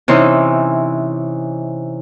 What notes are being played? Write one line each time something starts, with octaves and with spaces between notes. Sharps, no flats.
C3 E3 C#4 D#4 C5